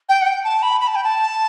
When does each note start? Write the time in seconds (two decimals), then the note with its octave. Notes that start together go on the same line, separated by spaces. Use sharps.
0.09 G5
0.21 F#5
0.26 G5
0.44 A5
0.62 B5
0.80 B5
0.87 A5
0.95 G5
1.04 A5